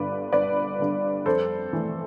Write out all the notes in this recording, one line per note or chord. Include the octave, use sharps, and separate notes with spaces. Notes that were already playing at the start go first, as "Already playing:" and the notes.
Already playing: G1 G2 D3 B4 D5
G1 B4 D5
G2 D3
F2 A4 C5
E3 A3